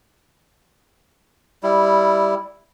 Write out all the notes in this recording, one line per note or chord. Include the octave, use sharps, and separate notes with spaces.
G3 E4